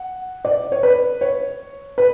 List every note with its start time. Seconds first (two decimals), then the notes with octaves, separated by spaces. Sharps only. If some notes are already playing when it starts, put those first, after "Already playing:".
Already playing: F#5
0.45 D5
0.72 C#5
0.83 B4
1.21 C#5
1.98 B4